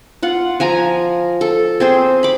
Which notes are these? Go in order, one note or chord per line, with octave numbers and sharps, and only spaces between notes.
F4 F#5
F3 G#5 A#5
A4
C4 G#4 C5
B5 D6